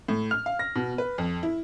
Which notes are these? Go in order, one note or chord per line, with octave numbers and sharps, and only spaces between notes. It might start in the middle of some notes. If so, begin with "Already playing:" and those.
A2
F6
F5
A#6
B2
B4
F2
E4